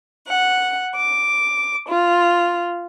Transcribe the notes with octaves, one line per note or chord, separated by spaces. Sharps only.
F#5
D6
F4